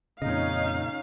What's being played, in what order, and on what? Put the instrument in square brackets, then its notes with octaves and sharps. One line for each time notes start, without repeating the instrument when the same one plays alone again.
[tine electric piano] F2 D#5 [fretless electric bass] A#2 C#3 [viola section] C#4 D#4 [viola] F5